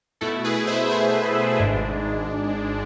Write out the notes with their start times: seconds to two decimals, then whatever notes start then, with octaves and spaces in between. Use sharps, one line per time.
0.21 B2 A3 E4 A4
0.44 G#4 B4
0.67 C5 E5
0.90 B2 A3 E4 G#4
1.59 G#1 G#2 G#3 D4